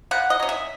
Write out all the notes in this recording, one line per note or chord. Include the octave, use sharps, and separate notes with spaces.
C#3 F#5
D#5
F#3 C#4
E5